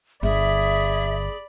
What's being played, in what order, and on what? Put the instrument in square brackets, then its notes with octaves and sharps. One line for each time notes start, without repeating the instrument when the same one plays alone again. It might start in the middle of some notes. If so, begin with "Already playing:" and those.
[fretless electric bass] G1 [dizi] G#4 [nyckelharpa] D5 B5 [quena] E5